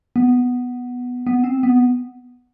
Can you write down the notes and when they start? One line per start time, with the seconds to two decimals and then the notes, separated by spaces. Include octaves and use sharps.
0.16 B3
1.27 B3
1.44 C4
1.63 B3